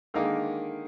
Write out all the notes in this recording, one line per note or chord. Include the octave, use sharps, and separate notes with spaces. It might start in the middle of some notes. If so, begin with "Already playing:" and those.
D3 D#3 G#3 A#3 D#4